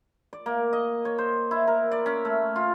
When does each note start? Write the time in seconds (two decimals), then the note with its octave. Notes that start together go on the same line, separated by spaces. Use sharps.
0.33 D5
0.46 A#3
0.73 D#5
1.05 C#5
1.18 C5
1.51 E4
1.67 A#4
1.92 D5
2.06 C#4
2.25 A3
2.56 F4